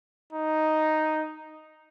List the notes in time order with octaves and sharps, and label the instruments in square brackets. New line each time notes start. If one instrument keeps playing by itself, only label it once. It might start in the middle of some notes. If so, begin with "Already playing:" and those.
[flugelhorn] D#4